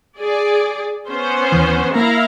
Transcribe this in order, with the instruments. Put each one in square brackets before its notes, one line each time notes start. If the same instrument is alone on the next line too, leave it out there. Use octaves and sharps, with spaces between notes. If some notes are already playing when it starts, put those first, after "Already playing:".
[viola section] G#4 D5
B3 C#4 C5
[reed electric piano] D#2 E3
[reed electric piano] A#3 [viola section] E4 F5 A#5